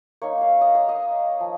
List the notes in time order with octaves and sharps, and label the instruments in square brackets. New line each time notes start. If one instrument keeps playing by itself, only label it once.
[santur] A#3 D#4 C#5
F5
D#5
C#5
D#5
F3